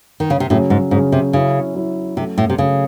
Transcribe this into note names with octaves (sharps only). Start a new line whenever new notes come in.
D#3
C#3
C3
A2 C#3 F#3 C#4 G#4
G#2
G#2 C#3 F#3 C#4 G#4
C3
C#3 F#3 C#4 E4
F#3 C#4 E4
C3 F#3 A3 C#4
A2
C3
C#3 F#3 A3 C#4